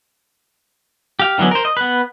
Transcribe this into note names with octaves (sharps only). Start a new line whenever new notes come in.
G4 F5
D3 E3 F#3 B3 C#4
A#4 C5
D#5
B3 B4